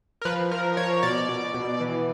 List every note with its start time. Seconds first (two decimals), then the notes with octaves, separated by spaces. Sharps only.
0.22 A#4
0.25 F3 B4
0.51 F3 A#4
0.77 F3 C#5
1.03 B2 D5
1.29 B2
1.54 B2
1.80 E3